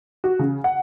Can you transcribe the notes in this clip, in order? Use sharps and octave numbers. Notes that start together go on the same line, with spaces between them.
F#4
C#3
F#5